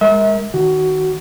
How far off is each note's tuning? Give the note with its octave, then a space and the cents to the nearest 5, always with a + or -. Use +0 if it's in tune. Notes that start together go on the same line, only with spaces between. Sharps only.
G#3 -25 A#4 +0 E5 -40
D#3 +0 F#4 +15